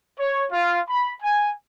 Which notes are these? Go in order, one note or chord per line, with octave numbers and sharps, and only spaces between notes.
C#5
F4
B5
G#5